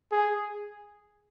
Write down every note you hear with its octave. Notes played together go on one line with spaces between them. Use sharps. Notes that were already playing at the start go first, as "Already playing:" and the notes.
G#4